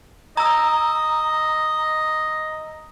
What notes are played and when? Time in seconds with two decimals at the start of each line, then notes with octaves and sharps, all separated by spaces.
0.37 D#5 A#5 E6